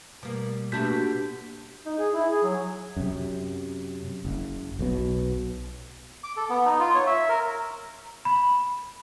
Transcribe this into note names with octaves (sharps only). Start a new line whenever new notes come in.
B2 G3 A#3
B2 A3 A#3 D4 F#4 G4 G6 B6
D#4
G#4
E4
G#4
F#3
F#2 C3
F#1
B1 B2
D6
A4
B3
D#4
F4
C#5
E5
A#4
B5